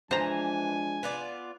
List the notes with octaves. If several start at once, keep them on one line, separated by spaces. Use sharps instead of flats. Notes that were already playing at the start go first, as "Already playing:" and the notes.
E3 F3 G#3 D4 C5 G#5 A#5
B3 F4 D5